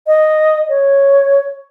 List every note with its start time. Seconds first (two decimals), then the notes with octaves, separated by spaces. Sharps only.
0.07 D#5
0.69 C#5